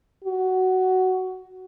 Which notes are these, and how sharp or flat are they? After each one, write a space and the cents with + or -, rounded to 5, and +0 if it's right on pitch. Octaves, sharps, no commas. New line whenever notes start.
F#4 +10